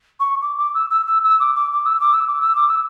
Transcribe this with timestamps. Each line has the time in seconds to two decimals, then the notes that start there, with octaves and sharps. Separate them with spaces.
0.20 C#6
0.42 D6
0.58 D6
0.74 E6
0.90 E6
1.07 E6
1.23 E6
1.39 D6
1.55 D6
1.72 D6
1.85 E6
2.00 D6
2.13 E6
2.28 D6
2.41 E6
2.55 D6
2.69 E6